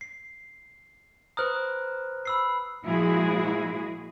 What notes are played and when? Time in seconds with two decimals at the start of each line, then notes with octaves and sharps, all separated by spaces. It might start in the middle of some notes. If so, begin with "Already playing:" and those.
0.01 C7
1.37 B4 C5 A#5 D#6 F6 F#6
2.25 B5 E6 C7
2.85 A#2 F3 G#3 E4 F#4 G#4